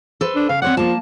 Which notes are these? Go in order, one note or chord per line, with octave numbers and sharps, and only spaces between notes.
A4 B4 C5
D4
C#3 F5
C4 C#5 D5 F#5
F3 A#3 A5